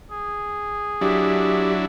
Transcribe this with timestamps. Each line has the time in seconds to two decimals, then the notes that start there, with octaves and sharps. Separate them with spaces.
0.11 G#4
1.01 F#3 D4 E4 G4